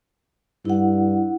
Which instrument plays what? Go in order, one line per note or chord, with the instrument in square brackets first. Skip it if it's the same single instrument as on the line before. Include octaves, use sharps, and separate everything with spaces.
[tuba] G2 [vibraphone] E4 F#5